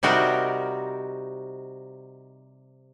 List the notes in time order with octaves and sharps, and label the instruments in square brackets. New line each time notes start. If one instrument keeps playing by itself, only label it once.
[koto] C3 G3 D#4 F#4 A#4